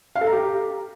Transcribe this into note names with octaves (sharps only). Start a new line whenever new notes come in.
F5
A4
A#5
G4